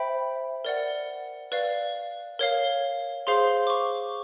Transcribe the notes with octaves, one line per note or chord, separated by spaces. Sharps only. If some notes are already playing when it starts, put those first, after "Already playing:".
Already playing: C5 E5 G5 B5
A#4 D5 F#5
B4 D5 F5
A#4 C#5 F5
G#4 C5 F5 C6
D6
C#6